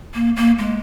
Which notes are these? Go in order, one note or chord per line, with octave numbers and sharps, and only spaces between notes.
A#3
A#3
G#3